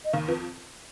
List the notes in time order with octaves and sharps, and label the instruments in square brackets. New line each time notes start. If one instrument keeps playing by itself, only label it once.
[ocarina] D#5
[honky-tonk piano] D#2 D#3 [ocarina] F5
[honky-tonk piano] F2 F3 [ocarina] B4